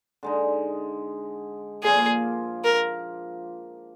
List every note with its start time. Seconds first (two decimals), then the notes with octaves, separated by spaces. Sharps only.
0.23 D3 G#3 D#4
1.83 A#2 F3 A#3 G#4
2.64 A#4